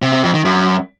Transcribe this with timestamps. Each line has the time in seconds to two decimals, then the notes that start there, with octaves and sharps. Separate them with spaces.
0.02 C3
0.13 C3
0.23 F2
0.34 D#3
0.45 F#2